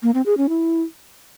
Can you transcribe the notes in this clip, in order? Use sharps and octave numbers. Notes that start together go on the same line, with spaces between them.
A#3
C4
G#4
C#4
E4